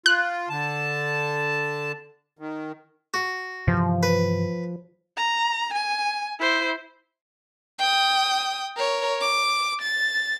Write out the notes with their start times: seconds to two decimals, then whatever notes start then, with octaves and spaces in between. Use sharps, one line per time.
0.06 F4 F#6
0.49 D3 A5
2.39 D#3
3.14 F#4
3.67 G2 C3 E3 F3
4.03 B4
5.17 A#5
5.73 G#5
6.40 E4 C5
7.79 G5 D#6
8.77 A#4 C#5
9.20 D6
9.82 A6